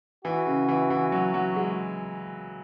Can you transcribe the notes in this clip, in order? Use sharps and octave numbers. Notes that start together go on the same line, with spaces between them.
E3 F#4
C#3
E3
E3
F#3
F#3
G#3